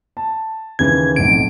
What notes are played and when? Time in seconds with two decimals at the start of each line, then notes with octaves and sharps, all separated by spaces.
0.17 A5
0.79 D#2 C#3 E3 G#6
1.16 D1 B1 F2 D7